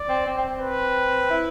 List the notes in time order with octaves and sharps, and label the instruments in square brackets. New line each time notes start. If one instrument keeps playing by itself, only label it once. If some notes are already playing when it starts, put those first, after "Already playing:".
Already playing: [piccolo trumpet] D5
[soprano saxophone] C4
C4
C4
C4
[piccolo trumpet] B4
[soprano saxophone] E4